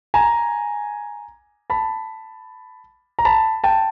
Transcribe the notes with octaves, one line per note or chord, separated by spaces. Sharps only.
G#5 A#5
A5 B5
A#5
A5 B5
G5 A5